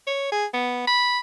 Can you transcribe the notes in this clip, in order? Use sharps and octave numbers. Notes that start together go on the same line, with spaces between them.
C#5
G#4
B3
B5